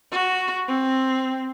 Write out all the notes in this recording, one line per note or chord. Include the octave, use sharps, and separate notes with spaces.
F#4
C4